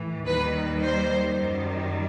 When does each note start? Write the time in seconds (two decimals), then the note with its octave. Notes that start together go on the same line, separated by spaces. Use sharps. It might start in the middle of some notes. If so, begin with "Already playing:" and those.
Already playing: A2 E3
0.27 D#2 D#3 G3 B4
0.82 C5
1.35 F#2 D#3 G3